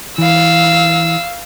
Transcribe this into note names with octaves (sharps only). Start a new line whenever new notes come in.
E3 F5 E6